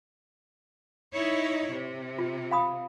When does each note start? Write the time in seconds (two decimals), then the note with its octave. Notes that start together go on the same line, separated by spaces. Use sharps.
1.13 D#4 E4 C#5
1.70 C3
2.19 F4
2.51 F5 B5 D#6